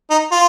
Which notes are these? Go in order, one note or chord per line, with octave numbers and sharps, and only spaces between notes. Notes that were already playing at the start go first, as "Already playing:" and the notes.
D#4
F4